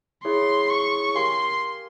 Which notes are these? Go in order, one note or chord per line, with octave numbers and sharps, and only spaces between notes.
E4 G#4 C#5 E5 C6
C#6
G4 A#4 F5 G#5 C6